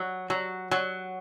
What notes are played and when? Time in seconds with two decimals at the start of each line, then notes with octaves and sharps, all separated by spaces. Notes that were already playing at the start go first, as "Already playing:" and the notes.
Already playing: F#3
0.30 F#3
0.71 F#3